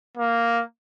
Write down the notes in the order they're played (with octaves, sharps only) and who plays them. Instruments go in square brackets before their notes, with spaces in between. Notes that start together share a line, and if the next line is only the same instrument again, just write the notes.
[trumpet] A#3